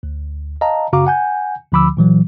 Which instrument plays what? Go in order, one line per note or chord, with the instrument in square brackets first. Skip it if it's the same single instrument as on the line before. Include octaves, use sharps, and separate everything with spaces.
[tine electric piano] D2
D#5 F5 A5 A#5
F#2 C#3 F#4 F5 A#5 D6
F#5 G#5 G6
D2 D3 F3 B5 D6 E6
A#2 E3 F#3